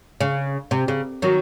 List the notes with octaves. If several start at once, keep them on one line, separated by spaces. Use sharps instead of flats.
C#3
C3
C#3
D#3 F#3